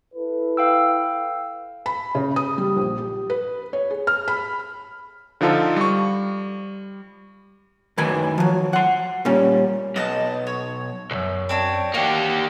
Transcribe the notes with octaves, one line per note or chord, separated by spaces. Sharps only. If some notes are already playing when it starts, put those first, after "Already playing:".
E4 A4 B4
F5 G5 E6
B5
C#3
D#6
G3
A#1
G4
B4
C#5
G#4
F6
B5
D3 F3 D#4 F4 A4
G3 C#6
F#2 A2 D#3 B4 G#5
F3 F#3
F#5 C6
A#2 G3 C#4
B1 D#5 A5
C#5
B1 F#2
C4 D4 C#5
A#3 D4 F#4 G4